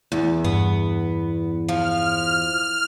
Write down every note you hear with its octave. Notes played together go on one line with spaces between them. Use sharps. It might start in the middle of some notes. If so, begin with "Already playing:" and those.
E2
G2 B3
F3 F6